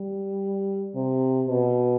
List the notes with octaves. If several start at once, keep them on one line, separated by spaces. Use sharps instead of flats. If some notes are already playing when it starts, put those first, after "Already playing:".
Already playing: G3
C3
B2